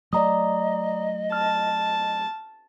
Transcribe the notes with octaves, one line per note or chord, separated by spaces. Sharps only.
F#3 A3 D5 D#5 A#5 D#6
A5 F6